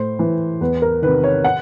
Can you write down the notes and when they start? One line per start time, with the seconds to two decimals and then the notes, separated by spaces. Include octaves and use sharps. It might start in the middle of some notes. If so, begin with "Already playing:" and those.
Already playing: A2 C5
0.19 E3
0.61 E2 B4
0.82 A#4
1.02 C3 D#3 B4
1.24 C#5
1.44 F#5